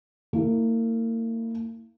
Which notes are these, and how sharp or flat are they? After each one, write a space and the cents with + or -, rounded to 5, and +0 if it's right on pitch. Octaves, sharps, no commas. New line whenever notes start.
A#3 -35 E4 -25